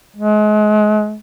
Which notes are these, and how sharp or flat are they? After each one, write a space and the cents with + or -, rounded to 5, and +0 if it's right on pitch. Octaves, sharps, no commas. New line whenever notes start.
G#3 +35